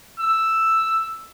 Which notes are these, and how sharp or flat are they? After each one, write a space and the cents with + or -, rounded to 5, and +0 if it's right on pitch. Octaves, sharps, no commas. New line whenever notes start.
E6 +5